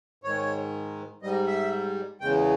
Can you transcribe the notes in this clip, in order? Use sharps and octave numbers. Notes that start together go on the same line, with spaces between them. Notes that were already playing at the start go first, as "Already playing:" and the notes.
G#2 D#3 G#3 C#5
G#2 G3 D#5
E5
E2 C#3 G#3 G5